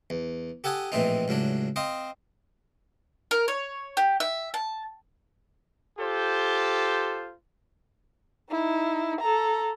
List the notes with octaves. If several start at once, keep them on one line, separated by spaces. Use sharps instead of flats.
E2
G4 A4 F#5 G#5 D#6
A#1 A2 E3 C4 D#4
C#2 A2 F#3 D4
C4 C5 D#5 F5 D#6
A#4
C#5
G4
E5
A5
F4 G4 A4 C5
D#4 E4
A4 A#5